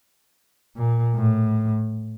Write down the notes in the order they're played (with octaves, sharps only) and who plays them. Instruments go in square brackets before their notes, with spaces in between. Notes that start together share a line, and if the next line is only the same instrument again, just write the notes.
[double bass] A#2
A2